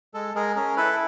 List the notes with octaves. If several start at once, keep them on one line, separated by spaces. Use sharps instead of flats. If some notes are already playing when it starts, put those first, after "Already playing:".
G#3 A4
G#3 G#4 A#4
C#4 G#4 A#4
E4 A4 B4